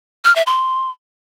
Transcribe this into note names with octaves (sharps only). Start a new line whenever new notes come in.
F6
E5
C6